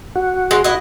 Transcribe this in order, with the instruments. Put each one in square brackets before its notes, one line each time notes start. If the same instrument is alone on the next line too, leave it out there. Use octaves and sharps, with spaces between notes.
[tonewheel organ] F#4
[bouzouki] G#3
E4 D#5